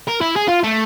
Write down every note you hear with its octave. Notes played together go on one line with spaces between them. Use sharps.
A#4
E4
G#4
F4
A3